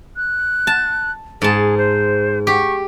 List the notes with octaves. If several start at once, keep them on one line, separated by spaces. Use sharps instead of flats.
F#6
A5
G#2 G#4 A5
C5
G4 C#6